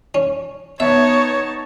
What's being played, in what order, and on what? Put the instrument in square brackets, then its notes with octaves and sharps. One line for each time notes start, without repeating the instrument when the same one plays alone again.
[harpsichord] C#4
[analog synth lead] B3 [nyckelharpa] D#4 A5 [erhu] C#5 [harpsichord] E5